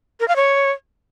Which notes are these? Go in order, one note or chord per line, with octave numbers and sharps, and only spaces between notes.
A#4
F5
C#5